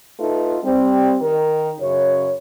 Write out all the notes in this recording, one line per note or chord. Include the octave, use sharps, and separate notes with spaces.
A3 D#4 F4 A4 B4
G3 C4
D#3 A#4
F#2 C#3 C#5